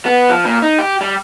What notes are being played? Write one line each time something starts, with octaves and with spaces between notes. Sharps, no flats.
B3
F3
A#2
D#4
G4
G3